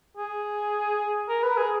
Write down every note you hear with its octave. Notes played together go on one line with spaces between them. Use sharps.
G#4
A#4
B4
G#4